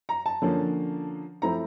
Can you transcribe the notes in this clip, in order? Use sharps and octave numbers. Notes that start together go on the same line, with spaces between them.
A#5
A5
D3 F3 A#3 C#4
F3 A3 C4 E4 A#5